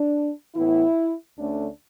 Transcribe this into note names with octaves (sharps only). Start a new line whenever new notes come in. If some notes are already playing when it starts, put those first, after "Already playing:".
Already playing: D4
A2 E3 B3 E4
D2 D3 A3 C#4 D4